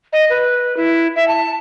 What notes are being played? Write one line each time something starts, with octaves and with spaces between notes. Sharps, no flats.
D#5
B4
E4
E5
A5